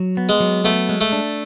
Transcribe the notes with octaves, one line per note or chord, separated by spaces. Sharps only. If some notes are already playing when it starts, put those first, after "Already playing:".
Already playing: F#3
B3
G#3
F#3
A3 B3
G#3
A3
D4